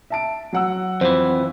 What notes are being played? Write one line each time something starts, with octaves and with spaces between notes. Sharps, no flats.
E5 A5 D7
F#3 F#5 E6
F2 E3 C5